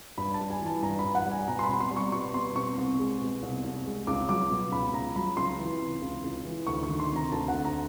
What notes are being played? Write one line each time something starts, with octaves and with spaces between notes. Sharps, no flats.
G2 B5
A5
G3
G#5
E3 A5
G2 A#5
B5
G2
F#5
G3
G#5
B2 A#5
C6
B5
C4
C6
G3
C#6
B2 C#6
B2 C6
C4 C#6
C2
G#3
B2
C2
C2
G#3
C#2 D6
F#3 D6
B2
C#2 B5
C#2 A#5
F#3 B5
C#2 C6
E3
C3
C#2
C#2
E3
D2 C#6
C#6
D#3
C6
C3
A#5
D2 A5
D2 F#5
A#5